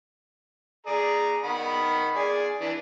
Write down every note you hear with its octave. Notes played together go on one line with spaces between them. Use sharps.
G#4 D5 A#5
D#3 F#5 B5
G#4 D5 G#5
E3 D4